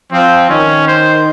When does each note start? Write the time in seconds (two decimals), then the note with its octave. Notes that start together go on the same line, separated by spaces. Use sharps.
0.12 F3 C4
0.49 D#3 C#4
0.88 C5